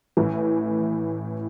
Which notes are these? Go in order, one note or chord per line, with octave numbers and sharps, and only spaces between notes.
A1 A2 E3